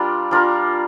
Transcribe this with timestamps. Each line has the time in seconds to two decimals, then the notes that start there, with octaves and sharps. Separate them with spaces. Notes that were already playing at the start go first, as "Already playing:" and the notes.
Already playing: G3 D4 F4 A#4
0.31 G3 D4 F4 A#4